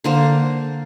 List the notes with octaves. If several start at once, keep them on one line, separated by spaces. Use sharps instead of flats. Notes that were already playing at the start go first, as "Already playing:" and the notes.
D3 A#3 C5